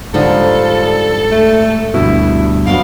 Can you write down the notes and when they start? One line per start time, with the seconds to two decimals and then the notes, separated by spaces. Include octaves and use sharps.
0.14 G#2 D3 F3 G3 D#4 A4
1.32 A3
1.94 D2 G2 B2 E4
2.67 G2 F#3 B3 F5 C6 D6